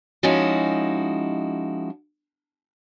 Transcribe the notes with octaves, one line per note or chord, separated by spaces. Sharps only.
F3 G#3 C#4 D#4 E4 F#4